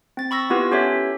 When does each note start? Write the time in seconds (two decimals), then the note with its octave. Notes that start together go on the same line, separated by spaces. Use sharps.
0.17 C4 A6
0.31 B5 C#6 E6 A#6
0.50 B3 E4 F4 G4 B4
0.71 C#4 G4 A4 C#5 E5